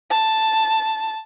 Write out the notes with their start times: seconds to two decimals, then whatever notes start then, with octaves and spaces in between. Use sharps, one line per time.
0.11 A5